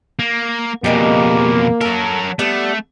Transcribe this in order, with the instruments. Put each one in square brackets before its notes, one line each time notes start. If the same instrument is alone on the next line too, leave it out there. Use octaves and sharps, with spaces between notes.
[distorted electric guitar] A#3
[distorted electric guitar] F2 B2 [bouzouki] G3 G#3 G4 [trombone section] A#3
[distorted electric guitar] F#3 A#4 [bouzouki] A4
[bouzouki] G3 B3 D4 [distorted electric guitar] A3